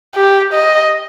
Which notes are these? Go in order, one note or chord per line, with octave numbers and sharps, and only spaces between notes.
G4
D#5